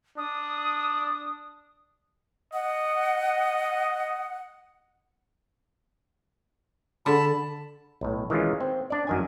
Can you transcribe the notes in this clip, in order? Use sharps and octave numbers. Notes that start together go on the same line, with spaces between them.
D4 D#6
D#5 F#5
D3 A5 B5
B1 A2
D#3 E3 G#3 C#4 F4
C4
D4 D5
F#2 D#3 G#5